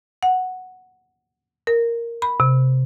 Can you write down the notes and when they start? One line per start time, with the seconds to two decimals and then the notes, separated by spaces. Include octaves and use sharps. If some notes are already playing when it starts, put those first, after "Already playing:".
0.23 F#5
1.67 A#4
2.22 B5
2.40 C3